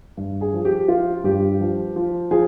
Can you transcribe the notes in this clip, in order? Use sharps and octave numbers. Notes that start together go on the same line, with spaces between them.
G2
G#4
F3
G4
F3 F4
G2 G4
F3
F3
F3 G#4